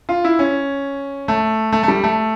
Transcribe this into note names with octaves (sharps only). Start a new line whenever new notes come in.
F4
E4
C#4
A3
A3
A3
G3
A3